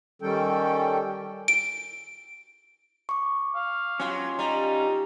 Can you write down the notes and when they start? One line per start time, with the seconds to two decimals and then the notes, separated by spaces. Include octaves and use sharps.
0.22 D#3 G3 C#4 A4 G5
1.48 D7
3.09 C#6 D6
3.55 F5
4.00 F#3 C#4 F4
4.39 G3 D#4